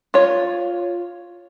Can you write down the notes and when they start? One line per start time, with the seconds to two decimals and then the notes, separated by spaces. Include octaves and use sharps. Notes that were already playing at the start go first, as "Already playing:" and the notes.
0.14 F4 C#5